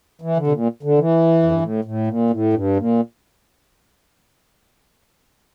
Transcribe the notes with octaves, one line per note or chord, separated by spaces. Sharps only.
E3
D3
C3
A#2
D3
E3
F2
G2
A2
A2
A#2
A2
G2
A#2